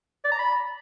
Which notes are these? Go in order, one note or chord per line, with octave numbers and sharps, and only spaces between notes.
D5
A#5
B5